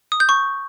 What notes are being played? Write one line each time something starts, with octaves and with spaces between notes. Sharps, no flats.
D#6
G6
C#6